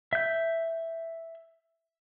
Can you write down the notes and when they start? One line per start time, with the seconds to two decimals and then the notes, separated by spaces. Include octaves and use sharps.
0.13 E5 G6